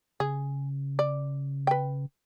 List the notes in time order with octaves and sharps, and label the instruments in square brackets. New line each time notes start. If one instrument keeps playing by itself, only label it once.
[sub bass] C#3 [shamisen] G#4
[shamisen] D5
B4 G5